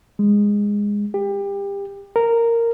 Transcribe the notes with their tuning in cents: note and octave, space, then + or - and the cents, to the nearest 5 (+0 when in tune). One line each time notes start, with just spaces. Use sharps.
G#3 -15
G4 +25
A#4 -10